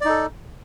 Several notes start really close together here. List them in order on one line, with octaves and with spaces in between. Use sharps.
D5 D#4 A4